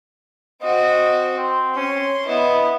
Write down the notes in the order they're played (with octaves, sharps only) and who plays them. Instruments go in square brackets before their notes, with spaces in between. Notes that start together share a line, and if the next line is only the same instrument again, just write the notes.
[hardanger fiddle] C4 F#4 [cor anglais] D#5
[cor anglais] C4
[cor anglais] C#4 [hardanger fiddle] C6
[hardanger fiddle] B3 E4 [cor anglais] D#5